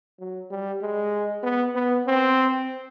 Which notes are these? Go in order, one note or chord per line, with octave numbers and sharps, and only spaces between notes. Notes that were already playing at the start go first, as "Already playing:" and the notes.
F#3
G3
G#3
B3
B3
C4